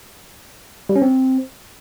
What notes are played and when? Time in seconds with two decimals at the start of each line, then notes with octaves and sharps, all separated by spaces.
0.89 G3
0.96 C#4
1.02 C4